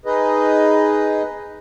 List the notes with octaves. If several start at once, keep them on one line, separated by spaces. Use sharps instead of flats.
D#4 G#4 B4 D#5